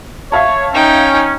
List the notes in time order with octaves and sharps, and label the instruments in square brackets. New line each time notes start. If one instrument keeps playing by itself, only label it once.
[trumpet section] C#5 [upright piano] E5 F5 A5
[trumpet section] C#4 [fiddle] D#4 G5